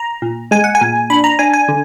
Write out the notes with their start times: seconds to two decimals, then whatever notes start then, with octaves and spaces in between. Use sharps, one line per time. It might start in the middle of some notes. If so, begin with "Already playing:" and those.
Already playing: A#5
0.22 A#2
0.51 G#3 G#5
0.64 F#5
0.75 G#5
0.81 A#2
1.10 D4 B5
1.24 A#5
1.39 D4 G#5
1.53 G#5
1.68 D3